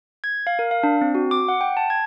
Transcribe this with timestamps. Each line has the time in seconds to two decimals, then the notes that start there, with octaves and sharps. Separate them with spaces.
0.24 G#6
0.47 F5
0.59 A#4
0.71 F5
0.83 D4
1.01 C4
1.15 F#4
1.31 D6
1.48 F#5
1.61 G5
1.77 A5
1.90 G#6